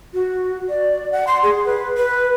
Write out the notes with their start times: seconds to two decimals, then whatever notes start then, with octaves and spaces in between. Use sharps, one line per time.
0.14 F#4
0.69 D5
1.12 F#5
1.27 C6
1.43 G#4
1.66 B4
1.97 B4